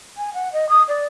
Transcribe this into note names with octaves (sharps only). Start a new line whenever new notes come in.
G#5
F#5
D#5
D#6
D5